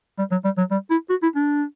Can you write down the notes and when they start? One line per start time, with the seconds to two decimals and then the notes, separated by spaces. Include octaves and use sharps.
0.18 G3
0.31 F#3
0.44 G3
0.58 F#3
0.71 G3
0.90 E4
1.10 F#4
1.22 E4
1.36 D4